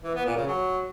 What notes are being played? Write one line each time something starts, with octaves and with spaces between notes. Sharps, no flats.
E3
B3
A#2
C#3
F#3